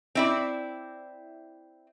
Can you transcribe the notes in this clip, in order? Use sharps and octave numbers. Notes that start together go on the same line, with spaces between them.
C4 E4 D5